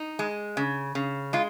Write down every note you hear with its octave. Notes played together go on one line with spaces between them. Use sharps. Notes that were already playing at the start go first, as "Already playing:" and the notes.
Already playing: D#4
G#3
C#3
C#3
G#3 F4